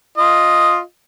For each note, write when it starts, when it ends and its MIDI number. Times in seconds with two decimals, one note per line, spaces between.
0.17 0.80 65
0.17 0.80 75